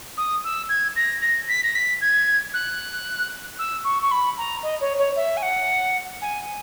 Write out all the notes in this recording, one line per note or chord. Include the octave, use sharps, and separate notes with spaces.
D#6
E6
G#6
A#6
A#6
B6
A#6
B6
G#6
F#6
E6
C#6
C#6
B5
A#5
D#5
C#5
C#5
E5
G#5
F#5
G#5